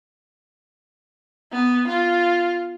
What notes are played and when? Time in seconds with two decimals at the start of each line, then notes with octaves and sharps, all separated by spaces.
1.52 B3
1.88 F4